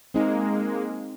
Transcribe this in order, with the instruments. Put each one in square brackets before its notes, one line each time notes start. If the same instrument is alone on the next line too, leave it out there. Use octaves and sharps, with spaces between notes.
[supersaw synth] G#3 A#3 [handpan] C4 D#4